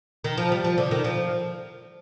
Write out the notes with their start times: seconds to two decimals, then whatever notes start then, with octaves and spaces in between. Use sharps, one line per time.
0.24 D#3
0.38 F3
0.52 G3
0.65 F3
0.78 D3
0.91 D#3
1.04 F3